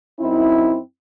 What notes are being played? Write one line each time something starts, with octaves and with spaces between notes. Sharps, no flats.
F#2 C4 D#4 E4